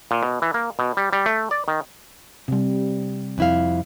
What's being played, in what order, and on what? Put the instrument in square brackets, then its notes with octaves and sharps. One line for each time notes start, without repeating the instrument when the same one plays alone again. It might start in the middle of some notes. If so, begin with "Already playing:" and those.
[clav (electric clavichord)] A#2
B2
E3
A#3
B2
G3
G3
A3
D5
D#3
[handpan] C3 G3
[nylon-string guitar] F2 E4 F5